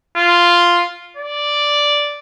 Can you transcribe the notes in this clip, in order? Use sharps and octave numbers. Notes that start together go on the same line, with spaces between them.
F4
D5